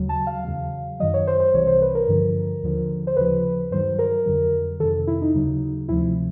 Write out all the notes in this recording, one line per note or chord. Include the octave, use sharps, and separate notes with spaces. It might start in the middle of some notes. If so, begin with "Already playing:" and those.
Already playing: D#2 C#3 F#3
A5
F5
E2 C#3 F#3
F#2 D#3 F#3 D#5
C#5
C5
C5
C2 C3 E3 C#5
C5
B4
A#4
G2 D3 F3
D#2 D3 F3
C5
D#2 C#3 F3 B4
G2 D#3 F#3 C5
A#4
F2 D3 F#3
F2 C3 D#3 A4
E4
D#4
D#2 C#3 F#3
D2 C3 F3 E4